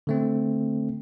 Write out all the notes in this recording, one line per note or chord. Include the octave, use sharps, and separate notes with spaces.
D3 A3 C4